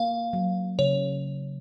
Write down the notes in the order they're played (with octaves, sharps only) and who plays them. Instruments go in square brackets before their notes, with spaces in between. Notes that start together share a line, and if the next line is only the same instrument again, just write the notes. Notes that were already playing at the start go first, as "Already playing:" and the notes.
Already playing: [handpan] A#3 [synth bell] F5
[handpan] F#3
[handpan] C#3 [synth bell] C#5